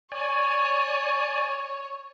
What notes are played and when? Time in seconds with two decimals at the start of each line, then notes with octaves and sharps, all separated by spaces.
0.12 C#5 D5 G#5